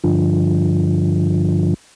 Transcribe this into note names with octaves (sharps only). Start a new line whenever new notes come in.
G2 D3 F3